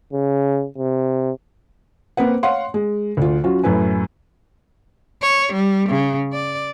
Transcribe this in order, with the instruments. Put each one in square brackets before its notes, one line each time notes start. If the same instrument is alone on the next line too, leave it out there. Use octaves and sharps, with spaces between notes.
[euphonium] C#3
C3
[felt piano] A#3 C4 B4 F#5
C#5 F5 F#5 C6
G#3
D2 F4
F#3 C#4 F4 F#4
F#2 A2 E4 B4 G#5
[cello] C#5
G3
C#3
D5